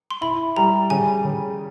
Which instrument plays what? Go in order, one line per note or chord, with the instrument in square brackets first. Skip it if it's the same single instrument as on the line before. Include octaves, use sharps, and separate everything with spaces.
[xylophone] C6
[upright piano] E4 [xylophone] B5
[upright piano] G3 [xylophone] A#5
[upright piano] C#3 [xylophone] G#5
[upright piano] C#3